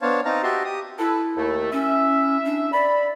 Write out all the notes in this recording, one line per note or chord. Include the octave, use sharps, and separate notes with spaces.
B3 D4 C5 C#5 F5 A5
C4 D#4 F5 A5 A#5
F#4 G4 D#5 E5 A5 C6
G4 D#6
E4 A4 B4
D#2 A3
C#4 E4 E5
D4
D5 B5